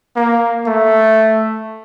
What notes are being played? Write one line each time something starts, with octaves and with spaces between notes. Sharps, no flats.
A#3
A3